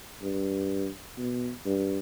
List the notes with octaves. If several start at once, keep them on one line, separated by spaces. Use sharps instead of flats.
G2
B2
G2